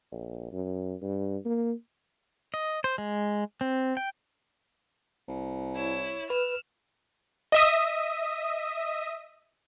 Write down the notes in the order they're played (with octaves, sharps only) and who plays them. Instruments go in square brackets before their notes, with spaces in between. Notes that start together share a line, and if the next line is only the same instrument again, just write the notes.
[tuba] A#1
F#2
G2
A#3
[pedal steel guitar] D#5
C5
G#3
C4
G5
[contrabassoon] C2
[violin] E4 C#5
[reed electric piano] B4 [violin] E6 F6
[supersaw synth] D#5 E5 D#6